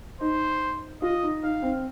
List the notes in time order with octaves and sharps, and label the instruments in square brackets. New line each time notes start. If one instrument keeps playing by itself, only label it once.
[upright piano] D#4 [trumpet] C5
[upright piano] F4 [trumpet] D#5
[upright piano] D#4
[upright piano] D#4 [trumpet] F5
[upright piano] C4